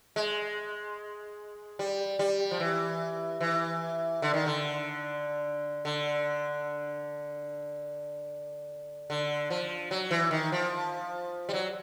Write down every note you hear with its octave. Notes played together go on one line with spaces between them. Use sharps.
G#3
G3
G3
F3
E3
E3
D3
D#3
D3
D3
D3
F3
F#3
E3
D#3
F3
G3
F#3